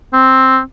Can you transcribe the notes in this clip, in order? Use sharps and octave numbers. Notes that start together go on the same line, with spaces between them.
C4